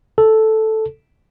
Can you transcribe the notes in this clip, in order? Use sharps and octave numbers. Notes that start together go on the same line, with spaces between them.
A4